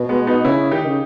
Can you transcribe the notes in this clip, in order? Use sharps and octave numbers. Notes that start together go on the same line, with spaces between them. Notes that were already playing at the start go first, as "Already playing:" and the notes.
Already playing: B2
G#3 B3
B3 D#4
C#3 C#4 E4
C#3
D#3 D#4 G4
C#3